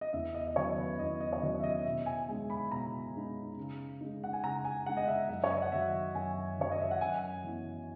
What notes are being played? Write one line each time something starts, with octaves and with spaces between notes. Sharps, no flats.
D#5
E2 E5
D#5
D#5
D#3 F#3 C#4 C#5
B4
E2 D#5
D#5
C#5
D#3 F#3 C#4 D#5
E5
D#5
B2 E5
G#5
G#3 D#4 G#5
B5
B2 A#5
G#3 D#4
C#3
G#3 D#4
F#5
G#5
C#3 A#5
G#5
G#3 D#4 F#5
D#5
E5
F#2 E5
C#5
D#5
F#5
D#3 F#3 E5
F#2 G#5
D#3 F#3 C#5
D#5
E5
F#5
F#2 G#5
E3 B3